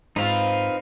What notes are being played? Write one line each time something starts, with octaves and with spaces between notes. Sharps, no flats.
G#2 C4 D#4 F4 B4 F5